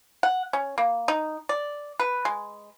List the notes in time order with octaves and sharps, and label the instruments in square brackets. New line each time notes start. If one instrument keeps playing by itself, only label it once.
[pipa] F#5
C#4
A#3
D#4
D5
B4
G#3